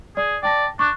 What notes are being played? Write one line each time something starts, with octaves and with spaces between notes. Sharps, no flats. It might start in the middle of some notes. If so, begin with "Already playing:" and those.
G#4 D5
D5 G5 A5 A#6
D4 C#6 D6 F#6